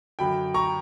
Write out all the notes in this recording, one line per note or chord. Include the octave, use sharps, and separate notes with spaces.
F#2 D3 F#3 G5 B5
A#5 C#6